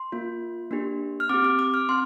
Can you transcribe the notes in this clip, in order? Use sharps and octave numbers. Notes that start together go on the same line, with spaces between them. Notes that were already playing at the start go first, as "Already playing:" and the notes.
Already playing: C6
A#3 F4
A#3 D4 G4
F6
C4 G4 D6
D6
D6
F6
C4 C6